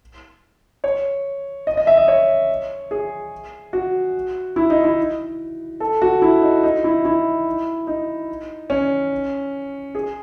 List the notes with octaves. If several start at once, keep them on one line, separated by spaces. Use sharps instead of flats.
C#5
D#5
D#5
E5
D#5
C#5
G#4
F#4
E4
D#4
E4
A4
F#4
E4
D#4
D#4
E4
E4
D#4
C#4
G#4